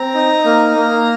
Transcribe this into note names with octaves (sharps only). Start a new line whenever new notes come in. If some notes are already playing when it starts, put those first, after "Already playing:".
Already playing: C4 A#5
D#4
A#3
A#3